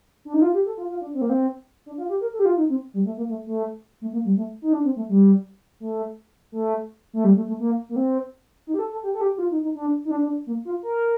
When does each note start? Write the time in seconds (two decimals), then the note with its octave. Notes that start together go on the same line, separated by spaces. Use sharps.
0.25 D4
0.34 D#4
0.42 F4
0.54 G4
0.66 A4
0.77 F4
0.90 F4
1.01 D4
1.14 C4
1.21 A#3
1.29 C4
1.86 D4
1.98 F4
2.09 G4
2.21 A#4
2.33 A4
2.39 G4
2.45 F4
2.57 D#4
2.69 C4
2.94 G3
3.05 A3
3.17 A#3
3.29 A3
3.47 A3
4.01 A3
4.13 A#3
4.25 G3
4.37 A3
4.62 D#4
4.73 D4
4.84 C4
4.96 A3
5.09 G3
5.80 A3
6.52 A3
7.13 A3
7.24 G3
7.36 A3
7.48 A3
7.60 A#3
7.89 A#3
7.96 C4
8.67 D#4
8.74 G4
8.79 A4
8.92 A4
9.03 G4
9.14 A4
9.21 G4
9.35 G4
9.38 F4
9.51 D#4
9.63 D#4
9.75 D4
10.05 D#4
10.11 D4
10.23 D4
10.47 A#3
10.65 F4
10.83 A#4